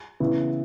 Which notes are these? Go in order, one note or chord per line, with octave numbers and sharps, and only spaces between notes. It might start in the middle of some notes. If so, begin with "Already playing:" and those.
C#3 E3 B3 E4